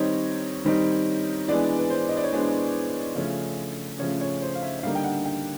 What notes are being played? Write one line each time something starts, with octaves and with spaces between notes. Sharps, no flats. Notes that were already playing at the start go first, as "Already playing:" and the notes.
Already playing: D#3 G3 C4 D#4 C#5
D#3 G3 C4 D#4
E3 G#3 B3 D4 D5
B4
C5
D#5
D5
C#5
E3 G#3 B3 D4 C5
C#3 F3 A3 C#4
C#3 F3 A3 C#4 C#5
C#5
C5
F5
E5
E5
D3 G3 A#3 D#4 F5
G5
F#5
G5